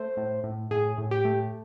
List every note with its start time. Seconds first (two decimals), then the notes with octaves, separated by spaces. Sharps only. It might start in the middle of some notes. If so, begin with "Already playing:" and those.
Already playing: A3 C5
0.17 A2
0.44 A2
0.71 A2 G#4
0.98 A2
1.11 G4
1.25 A3